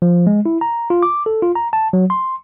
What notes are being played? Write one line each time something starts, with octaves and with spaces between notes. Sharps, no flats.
F3
G#3
E4
A#5
F4
D6
A4
F4
A#5
A5
F#3
C6